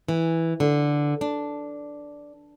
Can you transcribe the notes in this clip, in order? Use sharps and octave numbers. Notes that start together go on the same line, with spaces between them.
E3
D3
D4